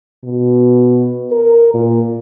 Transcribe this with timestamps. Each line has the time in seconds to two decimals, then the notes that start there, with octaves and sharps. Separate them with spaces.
0.24 B2
1.32 A#4
1.74 A#2